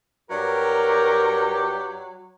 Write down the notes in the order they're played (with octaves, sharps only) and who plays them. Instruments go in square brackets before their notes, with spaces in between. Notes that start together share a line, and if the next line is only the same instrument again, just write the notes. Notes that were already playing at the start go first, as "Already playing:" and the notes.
[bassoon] G2 [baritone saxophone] F#3 [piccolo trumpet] G4 [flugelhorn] A#4